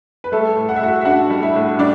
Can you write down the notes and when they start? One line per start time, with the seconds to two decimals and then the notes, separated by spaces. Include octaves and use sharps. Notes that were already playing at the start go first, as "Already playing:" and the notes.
0.24 B4
0.32 G3 A3 A4
0.56 A2
0.69 F#5
0.76 E5
0.81 A2 F#4 F#5
1.01 E5
1.05 D4 F#4 F#5
1.30 G3
1.42 E4 E5
1.55 A2
1.79 G3 D4 D5